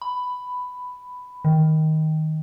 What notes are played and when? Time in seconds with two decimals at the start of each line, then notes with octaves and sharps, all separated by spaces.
0.02 B5
1.45 D#3